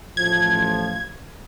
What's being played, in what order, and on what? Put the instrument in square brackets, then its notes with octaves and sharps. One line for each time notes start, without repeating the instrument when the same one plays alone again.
[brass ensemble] A1 F3 [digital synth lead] G#6